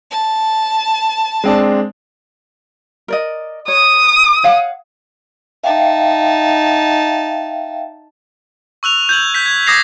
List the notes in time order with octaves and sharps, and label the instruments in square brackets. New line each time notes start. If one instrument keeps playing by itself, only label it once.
[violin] A5
[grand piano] G#3 C4 D4
[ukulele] A#4 D5 D#5
[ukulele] C#5 [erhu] D#6
[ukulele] C#5 F5 F#5
[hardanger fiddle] D#4 A5 [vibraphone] E5 F5 G5
[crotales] C#6 E6 F#6 F7
G6 G#6 F#7
G6 B6
G#6
D6 D#6 G#6 A#6 C7 F7